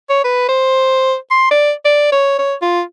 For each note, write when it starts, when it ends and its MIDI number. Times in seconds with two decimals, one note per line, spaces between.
0.10 0.23 73
0.24 0.46 71
0.49 1.15 72
1.31 1.47 84
1.51 1.72 74
1.85 2.07 74
2.12 2.37 73
2.39 2.55 73
2.62 2.82 65